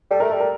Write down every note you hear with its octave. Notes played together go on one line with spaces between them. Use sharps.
G3 A4
A3 A#4
A4
G3
A#4